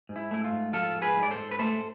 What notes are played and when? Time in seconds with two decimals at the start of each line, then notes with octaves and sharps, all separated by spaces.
0.09 G#2
0.16 E4
0.31 A3 E4
0.44 F4
0.52 G#2
0.73 F3 F4 A4
0.95 G#2
1.02 G#4 B4
1.16 G#2
1.23 D5
1.31 A4 C5
1.38 G#2
1.51 B4
1.59 A3 A4 C5